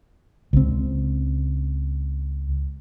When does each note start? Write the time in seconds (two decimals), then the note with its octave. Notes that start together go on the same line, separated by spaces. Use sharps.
0.53 C#2 C4